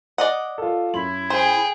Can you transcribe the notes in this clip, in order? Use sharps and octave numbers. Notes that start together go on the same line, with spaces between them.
D5 D#5 F#5
F4 A4
F#2 E4 C6 F#7
G#4 C5 G5